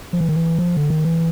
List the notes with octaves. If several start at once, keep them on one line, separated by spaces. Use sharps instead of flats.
F3
E3
D#3
E3
F3
D3
D#3
E3